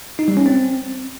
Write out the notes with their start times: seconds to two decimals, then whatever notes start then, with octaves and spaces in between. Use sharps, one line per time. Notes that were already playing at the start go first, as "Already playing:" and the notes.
0.19 D#4
0.28 G3
0.37 C#4
0.46 C4